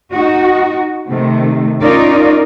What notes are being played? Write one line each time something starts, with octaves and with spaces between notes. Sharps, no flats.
D#4 F#4
C3 D#3 A3
C#4 D#4 F4 A#4 D5